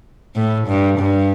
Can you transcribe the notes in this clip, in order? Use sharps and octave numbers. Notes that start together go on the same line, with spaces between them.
A2
G2
G2